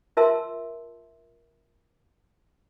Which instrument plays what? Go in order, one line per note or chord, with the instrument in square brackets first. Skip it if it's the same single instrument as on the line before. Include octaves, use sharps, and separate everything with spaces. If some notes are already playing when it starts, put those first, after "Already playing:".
[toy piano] F4 A#4 E5 A5 C6 E6